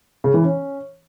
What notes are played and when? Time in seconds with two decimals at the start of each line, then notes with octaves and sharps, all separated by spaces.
0.24 C#3
0.34 E3
0.44 C#4